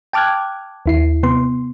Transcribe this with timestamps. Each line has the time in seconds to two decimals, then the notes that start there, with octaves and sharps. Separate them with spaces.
0.13 G5 A5 D6 F6 F#6 G#6
0.86 D#2 E4 C7
1.23 C3 B3 C6